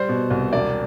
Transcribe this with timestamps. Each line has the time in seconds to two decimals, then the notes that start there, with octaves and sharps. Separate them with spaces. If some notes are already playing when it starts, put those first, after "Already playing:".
Already playing: G3 C5
0.09 B2
0.30 C2
0.52 E1 D5